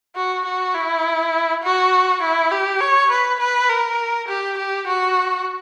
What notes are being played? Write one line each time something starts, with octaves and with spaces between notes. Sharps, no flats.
F#4
F#4
E4
F#4
E4
G4
C#5
B4
B4
A#4
G4
G4
F#4